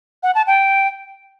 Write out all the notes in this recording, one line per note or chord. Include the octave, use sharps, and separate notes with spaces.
F#5
A5
G5